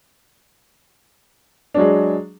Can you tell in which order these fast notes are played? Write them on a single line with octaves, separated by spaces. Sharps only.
D4 F#3 G#3